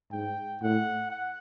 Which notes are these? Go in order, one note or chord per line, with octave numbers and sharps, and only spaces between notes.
G#2 G5
A2 F#5
F#5